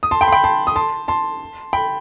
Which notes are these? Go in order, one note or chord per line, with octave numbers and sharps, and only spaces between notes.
D#6
A5 C6
G5 B5
C6
G5 B5
A5 C6
D#6
A5 C6
A5 C6
G5 B5